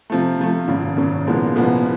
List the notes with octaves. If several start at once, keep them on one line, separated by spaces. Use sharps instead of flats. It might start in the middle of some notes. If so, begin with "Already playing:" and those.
C3 F3 A3
C3 F3 A3
G#1 F#2 C#3
G#1 F#2 C#3
C2 A#2 F3 G#3 B3
C2 A#2 F3 G#3 B3